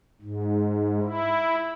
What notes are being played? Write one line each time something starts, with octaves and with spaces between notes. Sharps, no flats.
G#2
E4